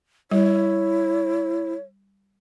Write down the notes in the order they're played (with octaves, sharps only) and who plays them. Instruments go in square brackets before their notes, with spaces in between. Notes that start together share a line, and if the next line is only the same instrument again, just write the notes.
[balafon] G3 [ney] E4 [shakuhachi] C#5